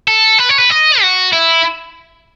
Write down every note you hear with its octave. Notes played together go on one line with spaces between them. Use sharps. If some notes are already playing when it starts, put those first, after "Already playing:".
A4
B4
C#5
B4
D#5
F#4
E4